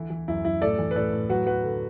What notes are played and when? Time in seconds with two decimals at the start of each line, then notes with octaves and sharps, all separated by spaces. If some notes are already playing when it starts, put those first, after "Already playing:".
Already playing: D3 E3 E4
0.10 E3
0.28 F#2 E4
0.45 F#2 E4
0.61 A2 A4 D5
0.78 E3
0.91 B4
0.96 A2 A4 D5
1.13 A2
1.30 F#3 F#4 B4
1.46 F#3 F#4 B4
1.63 D3